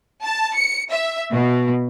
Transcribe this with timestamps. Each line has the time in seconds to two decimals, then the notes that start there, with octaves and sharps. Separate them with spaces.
0.23 A5
0.54 C#7
0.91 E5
1.33 B2